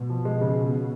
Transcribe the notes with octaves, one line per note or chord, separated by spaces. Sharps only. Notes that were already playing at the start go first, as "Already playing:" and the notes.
Already playing: B2
F3
G#3
C#3